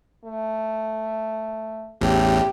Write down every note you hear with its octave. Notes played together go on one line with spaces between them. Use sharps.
A3
A1 E2 A2 G4